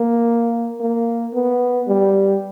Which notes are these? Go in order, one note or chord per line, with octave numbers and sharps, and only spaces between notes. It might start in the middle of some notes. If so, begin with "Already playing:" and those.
Already playing: A#3
A#3
B3
G3